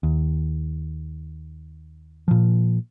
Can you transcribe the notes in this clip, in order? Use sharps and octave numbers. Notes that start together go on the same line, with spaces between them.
D#2
A#2 F3